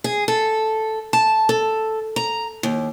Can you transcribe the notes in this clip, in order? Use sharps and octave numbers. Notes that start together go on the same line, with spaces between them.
G#4
A4
A5
A4
A#5
D#2